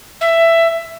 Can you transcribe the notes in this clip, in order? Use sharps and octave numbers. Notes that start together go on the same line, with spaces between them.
E5